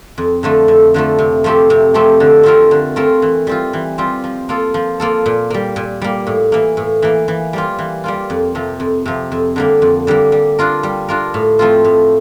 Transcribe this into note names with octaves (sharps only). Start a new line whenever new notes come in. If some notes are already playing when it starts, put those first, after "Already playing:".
F2
D3 F3 A3
F2
D3 F3 A3
C3
F3 A3 C4 G4
C3
F3 A3 C4 G4
D3
A3 C4 F4 A#4
D3
A3 C4 F4 A#4
E3
G3 C4 F4
E3
G3 C4 F4
F3
A#3 F4 A4
F3
A#3 F4 A4
A#2
G3 A#3
A#2
G3 A#3
A2
E3 A#3
A2
E3 A#3
E3
G3 A#3 F4
E3
G3 A#3 F4
F2
C3 F3
F2
C3 F3
F2
D3 G3 A#3
F2
D3 G3 A#3
G3
D4 F4 A#4
G3
D4 F4 A#4
A2
F3 A3 C4 F4
A2